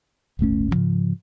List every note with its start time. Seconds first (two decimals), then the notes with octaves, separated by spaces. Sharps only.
0.39 D1 G1 A3 C#4
0.71 G#2 C#3 F3